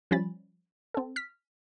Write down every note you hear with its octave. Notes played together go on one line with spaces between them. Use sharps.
F3 G3 C#4 G#5 B5 A6
C4 A4
F6 B6